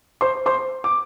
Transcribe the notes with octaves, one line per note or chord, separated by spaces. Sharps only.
C5 C6
C5 C6
D6